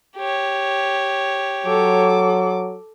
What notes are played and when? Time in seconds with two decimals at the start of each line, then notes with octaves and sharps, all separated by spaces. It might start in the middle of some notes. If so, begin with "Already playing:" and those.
0.16 G4 C#5
1.66 F#3 A4 D6